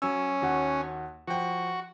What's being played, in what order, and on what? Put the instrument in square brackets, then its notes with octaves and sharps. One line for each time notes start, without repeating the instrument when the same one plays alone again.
[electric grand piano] F#3 E6 [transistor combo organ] C#4
[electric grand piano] D#2 F#4 F#5
[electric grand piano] F3 G5 [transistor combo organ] F#4